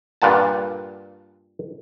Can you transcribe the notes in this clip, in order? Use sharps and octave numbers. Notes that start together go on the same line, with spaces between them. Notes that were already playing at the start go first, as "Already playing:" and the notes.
G2 A#2 F#5 A5